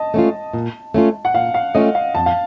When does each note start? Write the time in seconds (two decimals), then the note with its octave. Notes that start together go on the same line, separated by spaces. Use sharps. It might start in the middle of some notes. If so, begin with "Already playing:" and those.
Already playing: D#5 A5
0.14 A3 C#4 F4
0.54 A#2
0.94 A3 C#4 F4
1.25 F#5
1.34 A#2 F5
1.54 F5
1.75 A3 C#4 F4 D#5
1.95 F5
2.15 F2 A5
2.26 F5